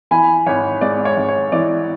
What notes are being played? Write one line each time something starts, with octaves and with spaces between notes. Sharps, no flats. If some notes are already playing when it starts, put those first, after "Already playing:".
E3 G#5 B5
G#1 C#5
G#2 D5
C#5
G#1
C#5
E3 D5